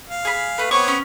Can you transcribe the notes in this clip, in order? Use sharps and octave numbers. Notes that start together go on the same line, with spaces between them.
F5
G#4 B5
A3 B4
B3 C4 C#5 C#6 D6
C#4